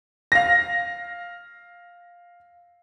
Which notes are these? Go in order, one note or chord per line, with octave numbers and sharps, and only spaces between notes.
F5 A#6